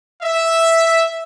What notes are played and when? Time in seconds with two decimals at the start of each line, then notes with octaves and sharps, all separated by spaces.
0.23 E5